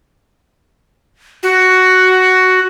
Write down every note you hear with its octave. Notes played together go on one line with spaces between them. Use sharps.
F#4